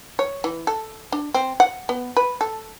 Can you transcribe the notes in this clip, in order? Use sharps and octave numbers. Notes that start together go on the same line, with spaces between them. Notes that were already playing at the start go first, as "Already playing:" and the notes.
C#5
E3
A4
D4
C4
F#5
B3
B4
A4